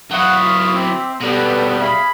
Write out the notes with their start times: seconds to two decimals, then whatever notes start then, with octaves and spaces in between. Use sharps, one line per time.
0.11 F#3 E4 F5 F#5 C#6 D#6
0.42 F4
0.74 C4 E5 D6 E6
1.21 B2 G3 B3 G4 A4 B4
1.79 G#4 E5 F5 B5